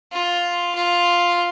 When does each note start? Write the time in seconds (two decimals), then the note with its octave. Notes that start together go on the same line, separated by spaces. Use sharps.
0.12 F4
0.75 F4